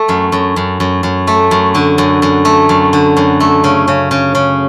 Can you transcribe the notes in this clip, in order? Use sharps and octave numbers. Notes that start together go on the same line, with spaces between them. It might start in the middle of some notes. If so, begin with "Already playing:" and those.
Already playing: A3
F#2
F#2
F#2
F#2
F#2
A3
F#2
D3
F#2
F#2
A3
F#2
D3
F#2
A3
C#3
C#3
C#3
C#3